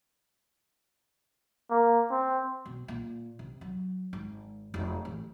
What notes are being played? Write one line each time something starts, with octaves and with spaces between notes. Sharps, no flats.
A#3
C4
B2
A#2
C3
F#3
G#1
F1
A1